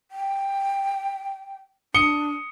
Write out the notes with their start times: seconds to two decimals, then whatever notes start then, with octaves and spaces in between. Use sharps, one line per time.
0.11 G5
1.94 D4 D#6 C#7 G7